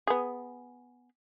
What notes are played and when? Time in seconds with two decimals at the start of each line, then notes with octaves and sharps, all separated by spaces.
0.07 B3 G#4